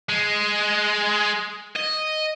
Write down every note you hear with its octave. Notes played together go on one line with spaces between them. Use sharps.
G#3
D#5